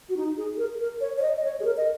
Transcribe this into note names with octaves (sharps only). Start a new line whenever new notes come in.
F#4
D#4
G#4
G#4
A#4
A#4
C#5
C#5
D#5
D#5
C#5
G#4
A#4
D#5